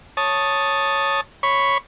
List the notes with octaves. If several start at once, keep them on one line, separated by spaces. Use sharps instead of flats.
C#5 A5 D#6
C#5 B5 C#6